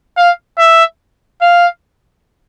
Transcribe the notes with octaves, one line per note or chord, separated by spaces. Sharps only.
F5
E5
F5